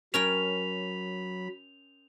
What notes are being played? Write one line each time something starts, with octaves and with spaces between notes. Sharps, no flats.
F#3 C#4 A#4 G5 B5 F7